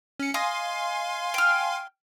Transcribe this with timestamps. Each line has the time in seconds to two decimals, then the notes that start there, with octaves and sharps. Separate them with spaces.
0.19 C#4 C#7
0.34 D#5 F5 G#5 C6
1.34 G5 F6